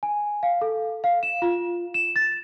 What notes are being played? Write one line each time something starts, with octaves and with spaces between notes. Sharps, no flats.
G#5
F5
A4
F5
E7
F4
E7
A6